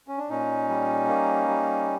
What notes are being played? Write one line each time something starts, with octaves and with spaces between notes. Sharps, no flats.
C#4
D4
A#2 C#4 D#4
G3
A#3
G3